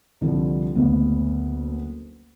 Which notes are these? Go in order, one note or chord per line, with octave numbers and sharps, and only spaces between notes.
C2 D3 F3 G3 F4
F#1 D2 B3